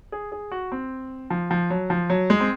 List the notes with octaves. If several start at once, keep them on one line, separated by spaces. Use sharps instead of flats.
G#4
G#4
F#4
C4
F3
F3
F#3
F3
F#3
G#3
C4